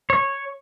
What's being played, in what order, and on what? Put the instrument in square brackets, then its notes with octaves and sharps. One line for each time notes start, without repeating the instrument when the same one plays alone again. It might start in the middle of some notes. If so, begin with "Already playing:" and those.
[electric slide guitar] C#5